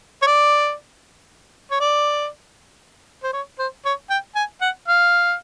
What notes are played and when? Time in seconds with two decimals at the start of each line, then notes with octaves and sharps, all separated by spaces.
0.22 C#5
0.27 D5
1.71 C#5
1.80 D5
3.24 C5
3.33 C#5
3.59 C5
3.86 C#5
4.10 G5
4.36 G#5
4.61 F#5
4.88 F5